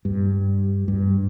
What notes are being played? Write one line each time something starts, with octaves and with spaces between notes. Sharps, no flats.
G2
G2